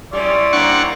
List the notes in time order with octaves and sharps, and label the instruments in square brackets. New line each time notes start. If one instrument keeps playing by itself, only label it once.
[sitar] G3 C#4 [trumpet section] E4 C6 D#6 [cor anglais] D5
[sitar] G3 A#3 C4 [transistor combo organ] D4 F#5 C#6